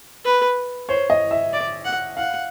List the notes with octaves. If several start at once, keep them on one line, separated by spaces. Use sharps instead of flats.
B4
C5 C#5
D#5
E5
D5
F#5
F5 F#5